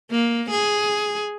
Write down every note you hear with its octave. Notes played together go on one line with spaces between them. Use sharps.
A#3
G#4